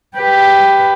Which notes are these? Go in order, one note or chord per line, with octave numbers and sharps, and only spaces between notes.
G4 B4